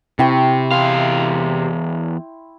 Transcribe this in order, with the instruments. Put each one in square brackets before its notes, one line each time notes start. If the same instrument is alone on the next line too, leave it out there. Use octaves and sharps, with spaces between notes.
[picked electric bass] C3 [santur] E4 G5 C#6
[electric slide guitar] E2 F5 [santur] C6